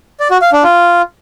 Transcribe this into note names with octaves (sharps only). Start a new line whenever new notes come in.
D5
F#4
F5
D4
F4